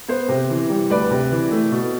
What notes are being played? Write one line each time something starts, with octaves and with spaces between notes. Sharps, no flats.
B3 C5
C3
E3
G3
D2 B4 D5
C3
E3
A3
B2